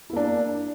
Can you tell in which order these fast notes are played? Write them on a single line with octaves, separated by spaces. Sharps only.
E4 A#3 D4